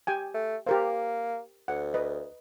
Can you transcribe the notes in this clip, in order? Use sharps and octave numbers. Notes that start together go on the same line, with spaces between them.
G4 G5 G#5
A3
A#3 G4 A#4 C5
D2 F#5
B4 D#5